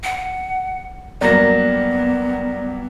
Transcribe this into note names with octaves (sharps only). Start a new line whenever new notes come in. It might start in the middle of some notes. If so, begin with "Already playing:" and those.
F#5
G2 F#3 A#3 B3 D5 A#6